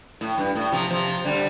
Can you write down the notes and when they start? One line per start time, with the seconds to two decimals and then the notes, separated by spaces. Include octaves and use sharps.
0.21 A2
0.38 G2
0.55 A2
0.72 C3 F3
0.90 C3 F3
1.25 D3 G3